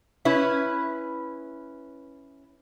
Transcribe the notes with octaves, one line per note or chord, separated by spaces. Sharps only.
C#4 E4 B4